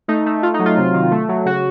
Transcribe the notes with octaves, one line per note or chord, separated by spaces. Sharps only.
A3 D#4
A3
A3 F4
D#4
F#3
F4
C3
D#3
A3
F#3
C#3 F#4